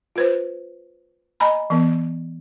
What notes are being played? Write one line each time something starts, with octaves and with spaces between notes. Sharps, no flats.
F4 B4 C5
D#5 G#5 A#5 B5
E3 B3